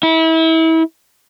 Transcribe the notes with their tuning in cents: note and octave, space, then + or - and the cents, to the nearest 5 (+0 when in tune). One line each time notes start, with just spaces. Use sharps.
E4 -30